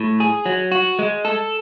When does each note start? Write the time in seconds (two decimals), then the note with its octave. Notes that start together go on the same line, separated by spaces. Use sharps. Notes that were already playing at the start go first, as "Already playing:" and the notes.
Already playing: A2
0.20 G#4
0.46 F#3
0.72 F#4
0.99 G#3
1.25 A4